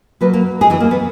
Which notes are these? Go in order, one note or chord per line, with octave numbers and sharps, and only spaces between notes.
B2 F#3 A#3 B3 B4
A#3 A#4
G#3 G#4
E3 E4
A#3
B3